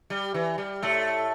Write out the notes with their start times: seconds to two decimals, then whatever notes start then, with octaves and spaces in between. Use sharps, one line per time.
0.10 G3
0.34 E3
0.58 G3
0.82 A2 A3